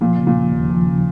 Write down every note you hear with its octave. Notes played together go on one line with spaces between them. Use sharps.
A#2 F3
C#3
A#2
D#2
D#2
F3
C#3